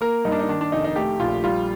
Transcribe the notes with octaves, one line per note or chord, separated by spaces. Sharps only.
A#3 A#4
G2 D#4
D4
D#4
D#3 D4
D4
F1 D#4
D#4
A3 G4
A#1 F4
G3 F4